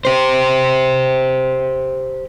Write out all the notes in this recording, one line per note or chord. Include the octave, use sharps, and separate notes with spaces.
G4 C5